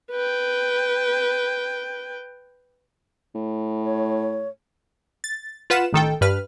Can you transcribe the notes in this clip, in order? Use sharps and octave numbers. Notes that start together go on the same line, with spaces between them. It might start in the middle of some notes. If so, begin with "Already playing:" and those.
B4 G5
A2
C#5
A6
F4 B4 F#5 E7
A1 D#3 A4 G5
G2 B4 F6